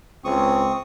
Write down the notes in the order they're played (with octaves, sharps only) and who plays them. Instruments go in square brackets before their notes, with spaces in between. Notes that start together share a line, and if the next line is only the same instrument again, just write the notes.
[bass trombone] C#2 [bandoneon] C4 C#6 D#6